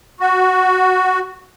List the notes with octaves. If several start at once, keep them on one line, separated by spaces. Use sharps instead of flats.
F#4